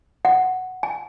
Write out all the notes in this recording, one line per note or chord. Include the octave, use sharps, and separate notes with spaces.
F#5
G#5